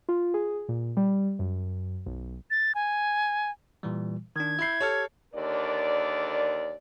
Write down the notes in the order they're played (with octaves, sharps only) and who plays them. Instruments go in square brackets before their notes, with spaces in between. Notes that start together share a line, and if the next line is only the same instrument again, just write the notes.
[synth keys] F4
G#4
A#2
G3
F#2
B1
[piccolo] A6
G#5
[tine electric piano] A#2 E3 G3
[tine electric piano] D#3 D4 [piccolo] G#6
[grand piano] E4 C7 [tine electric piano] E5 B5 G6
[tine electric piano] G4 F6 [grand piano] A4 C#5
[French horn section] D#2 D3 A#4 D5